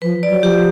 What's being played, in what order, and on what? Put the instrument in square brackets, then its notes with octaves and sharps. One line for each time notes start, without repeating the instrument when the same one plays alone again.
[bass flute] F3 [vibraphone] B4
[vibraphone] D5
[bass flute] F#3
[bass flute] F3 [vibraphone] G4